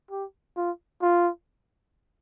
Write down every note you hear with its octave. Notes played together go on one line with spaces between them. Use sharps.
G4
F4
F4